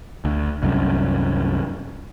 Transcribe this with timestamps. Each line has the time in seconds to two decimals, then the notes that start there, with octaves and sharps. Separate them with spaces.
0.25 D2
0.63 C2 F#2